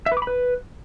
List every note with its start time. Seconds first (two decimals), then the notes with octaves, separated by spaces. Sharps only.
0.06 E5
0.12 B4
0.17 D6
0.22 B5
0.27 B4